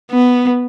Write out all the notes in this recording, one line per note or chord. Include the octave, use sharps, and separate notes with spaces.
B3